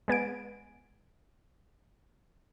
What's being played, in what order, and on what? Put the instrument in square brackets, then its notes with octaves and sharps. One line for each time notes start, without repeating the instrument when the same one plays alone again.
[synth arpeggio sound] G#3 B3 G#5 D7